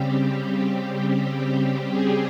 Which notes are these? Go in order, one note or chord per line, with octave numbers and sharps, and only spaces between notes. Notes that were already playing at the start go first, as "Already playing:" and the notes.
Already playing: C#3 G3 C4 G4
G4
G#4